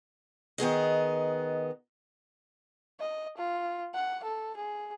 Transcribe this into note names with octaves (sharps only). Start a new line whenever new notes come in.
D#3 B3 G#4 D#5
D#5
F4
F#5
A4
G#4